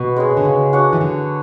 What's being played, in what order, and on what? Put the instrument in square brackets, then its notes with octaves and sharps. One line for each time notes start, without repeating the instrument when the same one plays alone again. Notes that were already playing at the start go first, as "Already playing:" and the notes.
Already playing: [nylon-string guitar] B2 [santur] F#4 B4
[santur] G#3 C#4 G#4 C#5
[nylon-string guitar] D3
C#3
[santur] D4 F#4 C#5
[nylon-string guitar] E3
D3